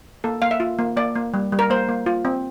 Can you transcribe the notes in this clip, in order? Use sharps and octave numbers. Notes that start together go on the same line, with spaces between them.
A#3 A4
A#3 F5
E5
F4
A#3
A#3 D5
A#3
G3
G3
A#4
A#3 C5
A#3
F4
C4